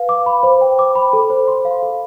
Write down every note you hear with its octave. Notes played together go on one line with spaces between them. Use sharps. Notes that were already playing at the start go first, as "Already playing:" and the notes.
Already playing: B4 F5
D6
B5
C5
G5
D6
B5
A4
C5
C6
F5
A4